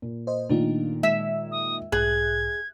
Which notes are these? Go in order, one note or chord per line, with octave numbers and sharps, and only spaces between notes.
A#2
C5 D#5
A#2 D#3 A3 D4 F4
G#3 E5
D#6
B1 G#2 G#4 F#6 G#6